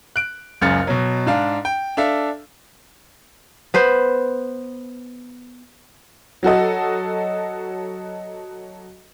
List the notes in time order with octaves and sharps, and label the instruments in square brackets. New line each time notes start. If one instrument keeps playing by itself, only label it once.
[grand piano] F#6 D7
F#1 C#2 F#2 F6 A6 C#7
B2 F#3
G#2 D4 F5
G5
D4 A4 E5 F5
[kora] B3 B4 C5
[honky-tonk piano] F#3 F#4 A4 D#5